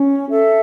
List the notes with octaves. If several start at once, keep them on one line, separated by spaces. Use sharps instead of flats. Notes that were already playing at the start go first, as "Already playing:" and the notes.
Already playing: C#4
A4 E5